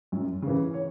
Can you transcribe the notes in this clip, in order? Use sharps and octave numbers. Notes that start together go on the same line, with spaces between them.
F#2
C#3 E3
C#5